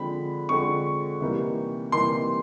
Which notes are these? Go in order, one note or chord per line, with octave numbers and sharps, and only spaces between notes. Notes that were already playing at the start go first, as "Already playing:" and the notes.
Already playing: D3 F3 G#3 C4 B5
D3 F3 G#3 C4 C#6
C3 E3 G3 A#3 D#4
C3 E3 G3 A#3 D#4 C6